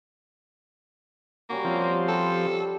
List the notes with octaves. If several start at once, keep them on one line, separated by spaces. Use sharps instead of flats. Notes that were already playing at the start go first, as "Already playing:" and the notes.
G3 A#3 C#4 F#4
F3 C4
G4 A4 B5